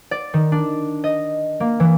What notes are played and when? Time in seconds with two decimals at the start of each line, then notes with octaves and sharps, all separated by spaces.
0.11 D5
0.34 D#3
0.52 D4
1.04 D#5
1.60 A#3
1.80 E3